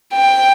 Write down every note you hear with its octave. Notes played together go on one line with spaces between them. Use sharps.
G5